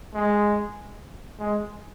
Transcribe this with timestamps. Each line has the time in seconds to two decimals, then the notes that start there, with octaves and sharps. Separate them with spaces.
0.14 G#3
1.39 G#3